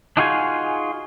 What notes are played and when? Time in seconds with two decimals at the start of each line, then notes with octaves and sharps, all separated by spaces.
0.17 D4 D#4 F4 F#4 G#4 G#5